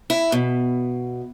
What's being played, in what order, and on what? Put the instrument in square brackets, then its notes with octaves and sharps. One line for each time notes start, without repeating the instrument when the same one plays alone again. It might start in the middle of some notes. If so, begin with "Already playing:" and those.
[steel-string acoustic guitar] E4
B2